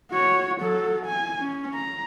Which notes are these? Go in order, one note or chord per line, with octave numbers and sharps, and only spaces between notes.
F#4 C#5
F#3 A4
G#5
C#4
A#5